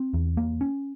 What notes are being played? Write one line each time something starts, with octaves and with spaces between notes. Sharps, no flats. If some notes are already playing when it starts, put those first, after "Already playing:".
Already playing: C4
E2
A#3
C#4